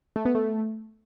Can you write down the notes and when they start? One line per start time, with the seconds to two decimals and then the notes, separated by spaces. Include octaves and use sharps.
0.16 A3
0.25 B3
0.35 A3